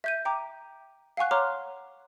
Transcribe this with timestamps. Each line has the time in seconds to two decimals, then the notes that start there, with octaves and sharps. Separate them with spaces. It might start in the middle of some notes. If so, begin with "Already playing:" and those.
0.04 E5 G6 D#7
0.25 G5 A#5 D6
1.17 F5 F#5 G#5 C#6 F#6
1.31 C#5 A#5 C6 D6 F6